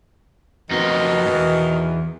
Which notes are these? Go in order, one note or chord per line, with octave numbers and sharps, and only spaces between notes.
F2 B2 D#3 D#4
E2 G#2